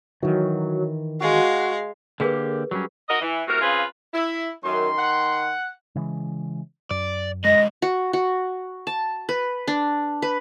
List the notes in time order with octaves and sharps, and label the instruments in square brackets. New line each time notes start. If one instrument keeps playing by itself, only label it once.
[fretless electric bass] D#3 E3 [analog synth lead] F#3
[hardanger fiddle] G#3 F5 [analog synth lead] F#4
[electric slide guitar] D3 A#3 G4 [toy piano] G#4 A#4 B4
[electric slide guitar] F#3 G3 C#4
[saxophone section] F#4 A#4 D#5
E3
A2 C3 F#4 A#4
C#3 C4 F4 G#4 B4
E4
[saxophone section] F#2 [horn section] D#3 C6
[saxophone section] F#5
[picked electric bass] C#3 E3 G#3
[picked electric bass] F#2 [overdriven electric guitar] D5
[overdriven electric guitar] D3 G#3 [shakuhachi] D#5 [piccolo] A#6
[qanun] F#4
F#4
A5
B4
D4
B4